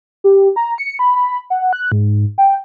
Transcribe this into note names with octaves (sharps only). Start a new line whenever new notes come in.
G4
A#5
C#7
B5
B5
F#5
F#6
G#2
G5